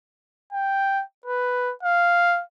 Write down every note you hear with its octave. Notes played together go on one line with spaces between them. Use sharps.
G5
B4
F5